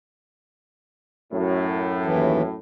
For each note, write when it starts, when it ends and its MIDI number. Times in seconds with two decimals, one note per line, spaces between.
1.32 2.59 42
1.32 2.59 45
2.06 2.42 39
2.06 2.42 52